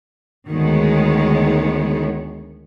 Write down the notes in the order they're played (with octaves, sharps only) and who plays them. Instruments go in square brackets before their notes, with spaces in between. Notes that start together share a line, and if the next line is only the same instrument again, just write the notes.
[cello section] D2 D#3 G#3 B3 C#5